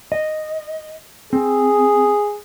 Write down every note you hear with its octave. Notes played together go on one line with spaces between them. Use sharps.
D#5
C4 G#4